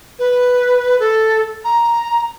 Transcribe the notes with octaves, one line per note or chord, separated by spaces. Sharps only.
B4
A4
A#5